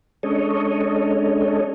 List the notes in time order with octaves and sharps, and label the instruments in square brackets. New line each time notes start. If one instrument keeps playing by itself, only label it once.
[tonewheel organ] G#3 C#4 D4 A4 C#5 D#5